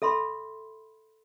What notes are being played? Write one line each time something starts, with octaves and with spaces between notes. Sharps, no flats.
A4 E5 B5 C6